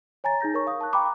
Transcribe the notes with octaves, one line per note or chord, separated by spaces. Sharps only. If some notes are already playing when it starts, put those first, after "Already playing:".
C#5 G#5 A#5 A6
D#4 G#4 G6 A#6
A#4 C#5 C#6
F5 D#6
A5 C#6 F#6
G5 A#5 B5 D6